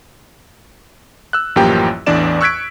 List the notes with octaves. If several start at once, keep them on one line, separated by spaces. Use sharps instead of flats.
E6 F#6
A1 F#2 F3 A#3 G4 G5
A1 E2 A2 D4 D5 E7
C#6 E6 F#6 G#6 B6 D7